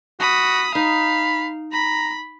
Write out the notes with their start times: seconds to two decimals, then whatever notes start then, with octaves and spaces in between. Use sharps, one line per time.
0.20 F#4 B5 D#6
0.75 D#4 F5 B5
1.73 A#5 B5